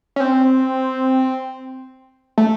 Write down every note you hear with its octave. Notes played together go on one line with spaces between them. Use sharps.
C#4
C4
A3